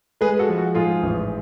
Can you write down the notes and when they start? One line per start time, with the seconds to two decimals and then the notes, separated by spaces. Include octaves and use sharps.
0.21 G#3 G#4 B4
0.39 F#4 A4
0.48 F3
0.58 F#4
0.75 G#2 F4 G#4
1.03 A1